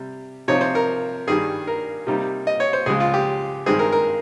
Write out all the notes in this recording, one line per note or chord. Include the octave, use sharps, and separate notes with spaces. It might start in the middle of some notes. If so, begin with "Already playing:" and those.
Already playing: C3 G3
C3 F3 C4 D#4 C#5
C5
A#4
G2 D#3 G3 G#4
A#4
C3 G3 A#3 D#4
D#5
C#5
C5
C#2 C#3 F3 G#3 G#4
F4
G4
G2 D#3 G#3 C4 G#4
A#4
A#4